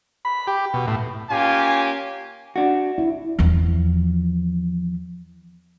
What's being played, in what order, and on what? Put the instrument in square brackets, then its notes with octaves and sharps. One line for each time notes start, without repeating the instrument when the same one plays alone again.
[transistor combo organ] B5
G4
B2
A2
[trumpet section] A#3 C#4 F4 G4 G#5
[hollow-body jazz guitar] D4 F#4
[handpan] E4
[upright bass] E2 F3